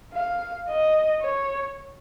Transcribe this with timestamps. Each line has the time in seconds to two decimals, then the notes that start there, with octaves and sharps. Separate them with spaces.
0.13 F5
0.68 D#5
1.20 C#5